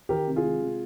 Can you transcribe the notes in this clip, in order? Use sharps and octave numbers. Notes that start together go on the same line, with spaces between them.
D#3 G4 A#4
C3
F4 G#4
G#3
C3